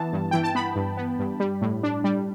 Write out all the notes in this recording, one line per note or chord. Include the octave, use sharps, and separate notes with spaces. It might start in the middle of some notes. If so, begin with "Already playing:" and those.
Already playing: E3 B3 A5
G2
E3 G5
A5
B3 B5
G2
B3
G2
G3
A2
D4
G3